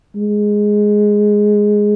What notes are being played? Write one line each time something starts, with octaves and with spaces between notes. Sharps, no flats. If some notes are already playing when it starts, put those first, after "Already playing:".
G#3